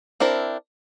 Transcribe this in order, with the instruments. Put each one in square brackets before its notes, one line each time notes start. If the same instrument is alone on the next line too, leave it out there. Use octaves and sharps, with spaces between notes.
[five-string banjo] C4 D4 E4 A#4